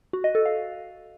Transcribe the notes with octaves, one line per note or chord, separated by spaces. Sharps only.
F#4
D#5
A4
F5